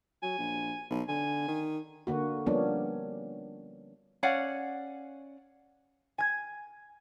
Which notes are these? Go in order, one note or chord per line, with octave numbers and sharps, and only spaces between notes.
F#3 G#5
A#1
B1
D3 G#5
D#3
D3 A#3 F#4
F3 G3 A#3 B3 C#4 D4
C#4 D5 F5 F#5
G#5 G#6